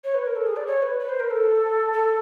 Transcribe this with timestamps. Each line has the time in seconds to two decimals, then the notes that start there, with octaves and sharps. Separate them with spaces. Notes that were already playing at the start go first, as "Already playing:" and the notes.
0.04 C#5
0.15 B4
0.26 A#4
0.36 A4
0.46 G#4
0.56 D5
0.67 C#5
0.82 B4
0.99 B4
1.09 C5
1.20 A#4
1.30 A4
1.93 A4